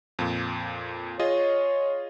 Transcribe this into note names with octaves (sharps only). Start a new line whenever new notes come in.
F2 A#2
F4 G#4 C#5 D#5